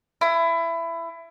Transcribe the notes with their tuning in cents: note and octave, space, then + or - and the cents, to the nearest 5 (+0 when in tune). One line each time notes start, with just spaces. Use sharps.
E4 +20